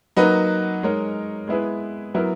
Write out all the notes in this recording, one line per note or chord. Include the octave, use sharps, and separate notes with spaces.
F#3 A#3 D#4 F#4 B4
G#3 D#4 A#4 C#5
G#3 B3 E4 G#4 B4
F#3 B3 E4 A#4